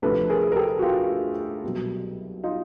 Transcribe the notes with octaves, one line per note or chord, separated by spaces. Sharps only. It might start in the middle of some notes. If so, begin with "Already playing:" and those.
D2 C3 F3 A4 B4
G#4 A#4
A#4
G4 A4
F#4
F4 G4
C2 B2 F#3
D#4 F4